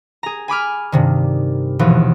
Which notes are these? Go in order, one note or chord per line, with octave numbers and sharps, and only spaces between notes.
G#4 A#5
G#5 B5 D6 F6
G2 C3 D#3
D#2 B2 E3 F3